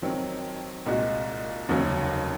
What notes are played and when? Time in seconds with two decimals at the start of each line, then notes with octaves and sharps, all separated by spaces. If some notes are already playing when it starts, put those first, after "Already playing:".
0.02 F2 D#3 F#3 C4
0.86 C2 A#2 G#3 D#4 F#4
1.69 F1 D#2 C#3 F#3